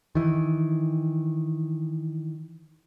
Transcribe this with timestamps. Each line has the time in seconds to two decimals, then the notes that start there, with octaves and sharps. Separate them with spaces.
0.15 D#3 E3